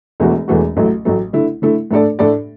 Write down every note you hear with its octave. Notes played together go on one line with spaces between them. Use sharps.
E1 E2 E3 A3 F#4
E1 E2 E3 A3 F#4
A1 A2 F#3 A3
A1 A2 F#3 A3
D3 A3 E4
D3 A3 E4
A2 A3 D4 A4 D5
A2 A3 D4 A4 D5